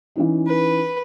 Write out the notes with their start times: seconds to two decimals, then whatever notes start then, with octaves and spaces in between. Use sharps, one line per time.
0.16 E3 C#4 D#4
0.47 B4